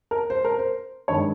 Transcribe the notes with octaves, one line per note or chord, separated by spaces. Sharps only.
A#4
C5
A#4
C5
G2 D#3 G#3 C#5